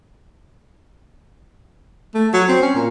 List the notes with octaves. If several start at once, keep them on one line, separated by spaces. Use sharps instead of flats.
A3
F#3
C4
C#4
A#2